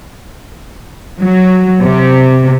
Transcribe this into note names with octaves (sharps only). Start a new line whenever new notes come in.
F#3
C3